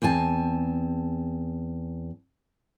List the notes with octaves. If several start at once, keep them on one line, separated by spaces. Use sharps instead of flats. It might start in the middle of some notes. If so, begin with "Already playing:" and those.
E2 C4 G#5 A5